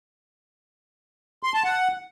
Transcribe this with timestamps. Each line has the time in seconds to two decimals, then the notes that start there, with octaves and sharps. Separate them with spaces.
1.43 C6
1.54 A5
1.64 F#5